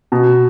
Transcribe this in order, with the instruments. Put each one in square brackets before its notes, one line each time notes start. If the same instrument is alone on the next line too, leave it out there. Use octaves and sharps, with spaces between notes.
[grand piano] B2